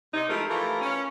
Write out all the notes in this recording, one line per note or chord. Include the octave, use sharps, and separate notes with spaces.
C3 D#4
F3 G#3 A3 E4 G4 A#4
E3 A3 E4 F4 G4 A#4
C#4